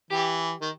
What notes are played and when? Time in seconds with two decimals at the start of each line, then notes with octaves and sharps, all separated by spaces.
0.10 E3 G4
0.61 D#3